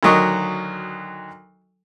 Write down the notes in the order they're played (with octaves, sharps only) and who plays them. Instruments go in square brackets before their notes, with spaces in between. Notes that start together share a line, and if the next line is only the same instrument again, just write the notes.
[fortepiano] D2 D#3 F#3 D#5 C#6